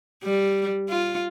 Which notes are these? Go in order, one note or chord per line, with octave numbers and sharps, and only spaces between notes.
G3
F4